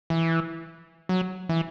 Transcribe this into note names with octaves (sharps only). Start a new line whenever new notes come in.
E3
F#3
E3